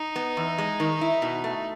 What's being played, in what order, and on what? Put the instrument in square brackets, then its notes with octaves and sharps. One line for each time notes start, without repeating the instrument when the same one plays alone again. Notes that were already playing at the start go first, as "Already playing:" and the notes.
Already playing: [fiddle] D#4
[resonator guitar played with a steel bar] B3
E2
G#3
D#3
E4
B2
A3